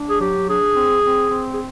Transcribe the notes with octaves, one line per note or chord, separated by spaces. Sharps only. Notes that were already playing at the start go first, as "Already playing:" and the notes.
Already playing: D4
G#4
F#3 G4
D4 G#4
C4
C4
C4
G#4